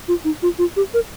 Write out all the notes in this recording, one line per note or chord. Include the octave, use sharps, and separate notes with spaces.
F4
D#4
F4
F4
G4
A#4